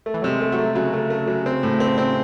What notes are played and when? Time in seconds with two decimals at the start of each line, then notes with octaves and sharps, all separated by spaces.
0.06 A3
0.14 E3
0.22 C3 F#3
0.29 G#3
0.41 A3
0.52 F#3
0.58 A3
0.75 C#3 F#3
0.93 A3
1.10 A3
1.27 F#3
1.46 C4
1.63 A2
1.80 C4
1.98 C4